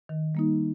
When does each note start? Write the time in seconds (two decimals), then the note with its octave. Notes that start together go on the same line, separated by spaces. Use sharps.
0.09 D#3
0.35 G3 A#3 D#4